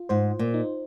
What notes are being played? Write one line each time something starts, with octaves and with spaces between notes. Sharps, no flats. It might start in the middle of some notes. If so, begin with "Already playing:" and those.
Already playing: F4
G#2 C5
A#2
D#4